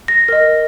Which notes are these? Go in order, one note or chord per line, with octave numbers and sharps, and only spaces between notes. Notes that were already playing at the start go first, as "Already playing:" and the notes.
A#6
A#4 D#5